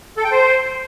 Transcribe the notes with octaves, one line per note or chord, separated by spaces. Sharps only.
A4
G5
C5